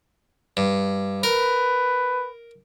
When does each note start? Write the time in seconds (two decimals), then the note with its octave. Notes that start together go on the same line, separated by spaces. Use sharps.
0.57 G2
1.23 A#4 B4